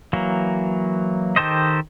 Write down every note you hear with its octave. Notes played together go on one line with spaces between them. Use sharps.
E3 F#3 A#3
D#3 G4 A4 C5 D#5